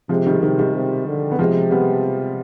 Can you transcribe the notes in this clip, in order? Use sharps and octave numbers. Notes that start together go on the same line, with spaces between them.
C3 F3 G#3
D#3 G3
C3 D#3
D#3 G3
C3
D3
B3
C3 F3 G#3
G3 B3